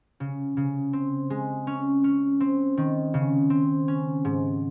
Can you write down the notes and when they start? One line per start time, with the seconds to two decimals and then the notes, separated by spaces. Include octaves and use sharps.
0.20 C#3
0.57 C#3
0.93 C4
1.30 G#3
1.67 C#4
2.04 C#4
2.40 C4
2.77 D#3
3.14 C#3
3.50 C4
3.88 C#4
4.25 G#2